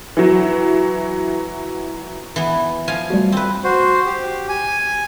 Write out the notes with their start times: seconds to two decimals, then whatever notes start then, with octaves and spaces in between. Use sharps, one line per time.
0.17 E3 F#3
2.36 E3 B3
2.88 F3 F5 G#5
3.10 G3 A3 F#4
3.32 C4 B4
3.64 F#4 C5
4.06 G4
4.49 G#5